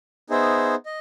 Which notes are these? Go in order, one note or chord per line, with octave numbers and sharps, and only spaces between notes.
B3 D#4 G#4 C5 E5
D#5